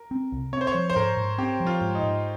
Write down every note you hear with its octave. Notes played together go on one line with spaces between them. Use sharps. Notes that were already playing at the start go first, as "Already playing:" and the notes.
Already playing: A#4
C4
C2
C4 C#5
C5
C#5
F3
C5
G#2 A#4
G#2
C4 G4
F3
F4
G#2
D#4
G#2